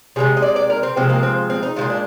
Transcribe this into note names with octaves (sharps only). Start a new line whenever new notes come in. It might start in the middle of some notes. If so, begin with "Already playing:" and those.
C3 F3 G#3 G#4
D#5
D5
D5
A#4
C4
C3 F3 G#3 C4
A#3
C4
C4
D#4
A#2 F3 G#3 F4
D4